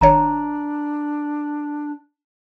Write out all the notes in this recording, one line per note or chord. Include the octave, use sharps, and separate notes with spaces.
G#1 D#3 D4 C#5 A#5